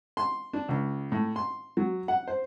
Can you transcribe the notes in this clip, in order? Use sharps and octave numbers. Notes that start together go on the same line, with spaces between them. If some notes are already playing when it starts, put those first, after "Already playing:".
C6
D4
C#2
A2
C6
F#3
F#5
C5